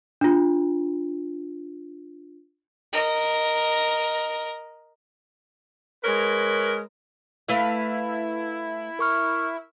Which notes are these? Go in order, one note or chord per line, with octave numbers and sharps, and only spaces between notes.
D4 F4
A#4 D#5
G#3 A#4 B4 C#5
A3 E4 B4 F5
A#4 C#6 F6